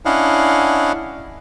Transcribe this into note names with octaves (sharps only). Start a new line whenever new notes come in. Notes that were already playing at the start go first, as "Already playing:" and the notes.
C#4 D4 E4 D#5 F5 F#5